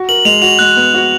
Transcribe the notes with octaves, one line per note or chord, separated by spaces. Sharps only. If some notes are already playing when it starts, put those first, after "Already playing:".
Already playing: F#4
A#4 F#7
G#3 F7
F#4 F7
G#3 F#6
B3
F#4